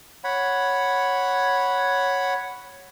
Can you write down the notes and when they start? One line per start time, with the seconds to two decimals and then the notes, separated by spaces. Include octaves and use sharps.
0.24 C#5 F#5 B5